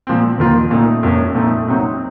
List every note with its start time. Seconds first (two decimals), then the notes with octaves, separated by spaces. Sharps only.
0.07 A#2 F3 C4
0.38 D#2 D#3 A#3 F4
0.71 A#2 A3 D#4
1.03 F2 C3 F3 A#3 C#4
1.35 A#2 A3 C4 D#4
1.68 C3 F#3 C4 D#4